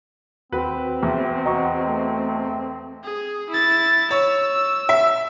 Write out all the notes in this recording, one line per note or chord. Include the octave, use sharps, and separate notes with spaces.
D#2 C4 F#4 B4
E2 E5
F#4 D#5 A#5 C#6
A3
G#4
E4 A6
C#5 E6
E5